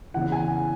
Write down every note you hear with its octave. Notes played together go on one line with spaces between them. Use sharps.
E2 C#3 E3 F#5
G#5
F#5